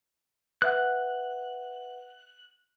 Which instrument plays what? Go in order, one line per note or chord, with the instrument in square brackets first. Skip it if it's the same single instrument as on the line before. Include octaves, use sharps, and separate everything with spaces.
[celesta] B4 E5 F#5 [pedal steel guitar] F#6